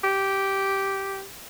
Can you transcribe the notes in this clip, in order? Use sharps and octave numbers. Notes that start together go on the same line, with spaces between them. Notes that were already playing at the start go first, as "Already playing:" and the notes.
G4